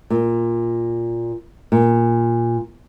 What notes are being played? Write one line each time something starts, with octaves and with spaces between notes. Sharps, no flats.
A#2
A#2